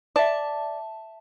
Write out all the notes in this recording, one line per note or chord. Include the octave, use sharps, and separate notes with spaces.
D5 E5 A5